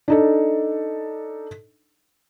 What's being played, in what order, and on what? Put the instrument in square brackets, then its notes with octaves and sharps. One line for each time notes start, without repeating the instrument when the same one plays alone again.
[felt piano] D4 D#4 A4